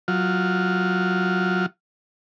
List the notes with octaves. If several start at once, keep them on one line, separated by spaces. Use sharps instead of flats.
F#3 F4